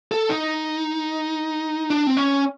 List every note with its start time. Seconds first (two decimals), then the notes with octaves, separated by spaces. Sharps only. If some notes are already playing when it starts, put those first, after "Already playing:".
0.12 A4
0.29 D#4
1.90 D4
2.07 C4
2.17 C#4